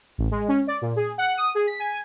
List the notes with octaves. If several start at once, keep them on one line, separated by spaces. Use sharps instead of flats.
A1
G#3
C#4
D5
A#2
G#4
F#5
D#6
G#4
B6
G#5